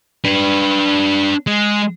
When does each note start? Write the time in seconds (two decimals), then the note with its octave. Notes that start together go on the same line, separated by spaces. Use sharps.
0.25 D4 B4
1.47 G#3